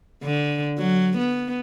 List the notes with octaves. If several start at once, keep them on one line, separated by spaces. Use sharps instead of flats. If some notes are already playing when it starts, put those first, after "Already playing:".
D3
F#3
B3